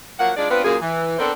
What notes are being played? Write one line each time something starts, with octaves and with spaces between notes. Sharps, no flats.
F3 F#3 A#3 F#5
G#3 D4 D#4 F4 D5
B3 C4 D4 F4 B4
F#2 A#2 A#3 G#4
E3
B3 C4 D4 A4 A#4 C5